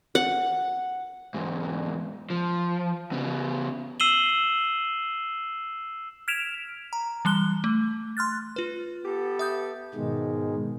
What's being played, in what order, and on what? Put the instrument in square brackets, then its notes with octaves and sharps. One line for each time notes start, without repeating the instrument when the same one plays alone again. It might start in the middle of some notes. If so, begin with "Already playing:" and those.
[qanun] F#5
[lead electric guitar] E2 G#2
F3
C#3 B3
[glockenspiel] E6 C7 D#7 E7 F#7 G7
[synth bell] F6 G#6 B6 D7 E7 F7
A#5
E3 G3 F#6 G7
A3
C6 F6 F#6 A6
F4 B4
[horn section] B3 G4 A4
[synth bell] E5 D#6 G6
[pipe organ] G#2 B2 D#3 G#3